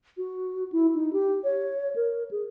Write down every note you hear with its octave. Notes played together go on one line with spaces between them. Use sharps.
F#4
E4
D#4
G4
C#5
A#4
G#4